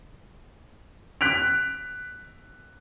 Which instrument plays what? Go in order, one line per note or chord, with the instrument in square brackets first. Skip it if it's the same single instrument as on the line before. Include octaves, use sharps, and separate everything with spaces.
[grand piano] F#6 B6 D7 F7